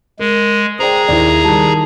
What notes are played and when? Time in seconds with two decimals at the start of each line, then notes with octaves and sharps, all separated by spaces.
0.19 G#3 A#4
0.79 G#4 C5 D5 G5 A#5
1.09 D#2 E4 D5
1.45 D#3 G3 A5